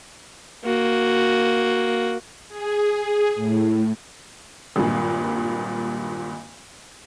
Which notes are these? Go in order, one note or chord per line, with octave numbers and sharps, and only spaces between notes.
A#3 F#4
G#4
A2
G#1 G2 A#2